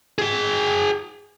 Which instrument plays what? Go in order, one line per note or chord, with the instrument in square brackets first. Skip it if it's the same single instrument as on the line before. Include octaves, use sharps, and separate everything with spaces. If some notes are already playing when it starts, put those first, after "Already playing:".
[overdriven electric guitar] G#4 G5